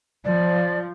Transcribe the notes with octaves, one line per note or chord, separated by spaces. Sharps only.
F3 D5